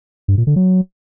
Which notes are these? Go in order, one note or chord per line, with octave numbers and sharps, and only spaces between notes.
G2
A#2
D3
F#3